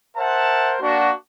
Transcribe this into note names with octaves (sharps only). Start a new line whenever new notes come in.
A#4 C5 E5 F#5 A5
A#3 D4 F#4